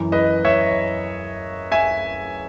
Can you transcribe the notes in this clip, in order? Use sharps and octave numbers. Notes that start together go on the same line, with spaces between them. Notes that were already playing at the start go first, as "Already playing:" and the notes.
Already playing: F#2 E3
B4 D#5
C#5 E5
E5 G#5